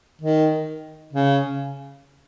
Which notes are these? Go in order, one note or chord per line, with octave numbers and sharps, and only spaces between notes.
D#3
C#3